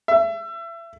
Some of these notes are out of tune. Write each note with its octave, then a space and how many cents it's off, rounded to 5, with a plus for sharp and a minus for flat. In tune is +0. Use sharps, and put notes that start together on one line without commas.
E5 +30